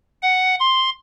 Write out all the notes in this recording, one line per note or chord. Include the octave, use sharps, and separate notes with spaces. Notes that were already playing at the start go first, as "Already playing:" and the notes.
F#5
C6